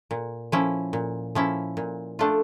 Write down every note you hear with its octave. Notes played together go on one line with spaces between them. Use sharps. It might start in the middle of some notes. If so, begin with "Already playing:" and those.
A#2
F3 C#4 E4
A#2
F3 C#4 E4
A#2
A3 D4 F4